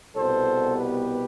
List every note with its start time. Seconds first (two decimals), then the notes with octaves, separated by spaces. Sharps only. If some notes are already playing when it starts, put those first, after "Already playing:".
0.16 C2 B2 B3 A4 C5
0.76 G4 B4